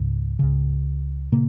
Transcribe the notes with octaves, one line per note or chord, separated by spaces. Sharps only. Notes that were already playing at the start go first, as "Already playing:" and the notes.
Already playing: C#2 G#2 C#3
C#2 C#3
A#2 C#3 A#3